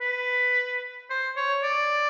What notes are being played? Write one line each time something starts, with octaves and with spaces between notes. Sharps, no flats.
B4
C5
C#5
D5